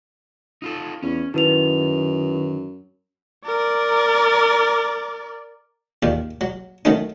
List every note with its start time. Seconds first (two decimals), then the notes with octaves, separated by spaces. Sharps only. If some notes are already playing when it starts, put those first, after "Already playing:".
0.62 D#4 F4 A4
1.02 E2 C#4
1.34 F#2 D#3 E4 B4 F7
3.46 A#4 D5
6.03 D#2 A#2 D#3
6.41 F#3
6.85 D#3 F#3 A3 C#4 D#4